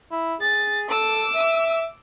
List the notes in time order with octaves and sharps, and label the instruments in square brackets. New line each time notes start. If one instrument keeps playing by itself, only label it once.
[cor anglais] E4
[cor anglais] G#4 [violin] A6
[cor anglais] A4 [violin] D6 E6
[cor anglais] E5